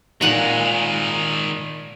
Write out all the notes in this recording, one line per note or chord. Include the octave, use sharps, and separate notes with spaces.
A#2 D#3 G#3 F#5 A#5